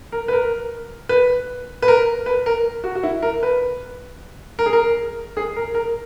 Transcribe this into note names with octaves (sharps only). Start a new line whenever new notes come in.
A#4
B4
A#4
B4
B4
A#4
B4
A#4
F#4
F#4
E4
A#4
B4
A#4
G#4
A#4
G#4
A#4
A#4